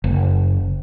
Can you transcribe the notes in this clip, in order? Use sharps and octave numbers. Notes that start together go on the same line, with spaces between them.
F#1